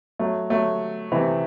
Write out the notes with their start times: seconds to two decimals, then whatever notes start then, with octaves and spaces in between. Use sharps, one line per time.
0.19 F#3 A3
0.50 F#3 A3
1.12 C3 E3